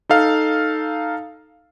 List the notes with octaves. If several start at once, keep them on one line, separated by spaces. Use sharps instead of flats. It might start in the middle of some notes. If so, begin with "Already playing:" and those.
D#4 A4 F5